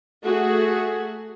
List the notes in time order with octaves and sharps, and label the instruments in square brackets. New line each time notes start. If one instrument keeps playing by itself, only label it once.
[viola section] A3 F#4 G#4